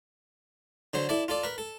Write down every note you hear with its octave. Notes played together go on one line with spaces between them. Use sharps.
D3 F#3 C5
E4 A4 D5
F4 A4 D5
A#4 B4
A4